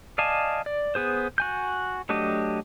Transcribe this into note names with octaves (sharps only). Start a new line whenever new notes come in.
D5 D#5 F5 G#5 A5
D5
B3 G#4 C5
F#4 G#5 G6
F#3 A3 D4 G4 D#5